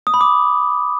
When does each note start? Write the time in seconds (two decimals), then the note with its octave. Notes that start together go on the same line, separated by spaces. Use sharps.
0.07 D#6
0.14 B5
0.21 D6